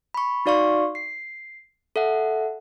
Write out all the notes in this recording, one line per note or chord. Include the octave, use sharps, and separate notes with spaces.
B5 C#6
D#4 F#4 D5 F5 C6 C#6
C7
A4 E5 F#5